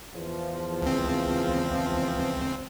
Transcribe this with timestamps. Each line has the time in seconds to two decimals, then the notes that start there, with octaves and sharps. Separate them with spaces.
0.13 E2 F3
0.82 C#2 C4